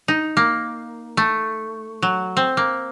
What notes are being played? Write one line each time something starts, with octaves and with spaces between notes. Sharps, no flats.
D#4
A#3
A3
F#3
C4
A#3